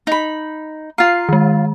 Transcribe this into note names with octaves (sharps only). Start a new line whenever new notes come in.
D#4 B5
F4 F5 A#5
D#3 G#3